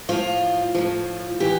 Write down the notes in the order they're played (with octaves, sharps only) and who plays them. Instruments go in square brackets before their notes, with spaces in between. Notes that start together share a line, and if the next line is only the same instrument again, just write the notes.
[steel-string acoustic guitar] A2 F3 F4
A2 F3
E3 G4